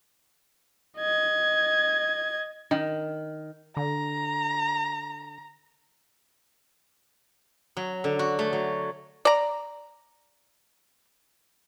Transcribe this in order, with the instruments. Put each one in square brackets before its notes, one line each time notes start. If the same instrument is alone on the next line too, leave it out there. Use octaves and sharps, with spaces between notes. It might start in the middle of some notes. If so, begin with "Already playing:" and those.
[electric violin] D#5 G#6
[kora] D#3
[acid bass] D3 [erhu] A#5
[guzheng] F#3
D3
F#4
A3
F#3
[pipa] D5 A#5